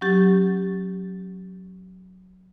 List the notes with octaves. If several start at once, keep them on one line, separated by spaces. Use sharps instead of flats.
F#3 C#4 G4 A6